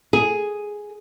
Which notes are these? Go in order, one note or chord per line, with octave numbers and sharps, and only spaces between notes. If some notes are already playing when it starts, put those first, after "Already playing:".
G#4